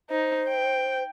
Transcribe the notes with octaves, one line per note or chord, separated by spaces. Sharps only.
D#4 C5
G5